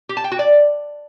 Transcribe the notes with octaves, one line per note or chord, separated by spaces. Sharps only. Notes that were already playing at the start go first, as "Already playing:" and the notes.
G4
A5
G5
F#4
D5